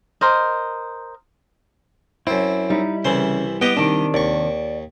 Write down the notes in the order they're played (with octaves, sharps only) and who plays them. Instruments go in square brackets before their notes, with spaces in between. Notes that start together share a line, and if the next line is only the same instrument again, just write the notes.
[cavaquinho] A#4 C5 D#5
[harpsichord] F#2 C4 [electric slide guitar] E4
[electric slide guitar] G3 E4 [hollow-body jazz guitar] D#4
[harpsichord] C2 E3 C5 [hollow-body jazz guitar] C#3
[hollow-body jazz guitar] B3 [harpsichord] G4 D#5 G5
[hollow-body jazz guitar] C3 D#3 D4
[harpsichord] D#2 C#6 [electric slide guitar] D5